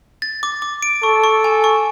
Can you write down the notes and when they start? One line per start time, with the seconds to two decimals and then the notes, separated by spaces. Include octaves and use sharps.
0.22 A6
0.43 D6
0.62 D6
0.83 D7
1.03 A4 C#6
1.24 C#6
1.44 G#5
1.64 C#6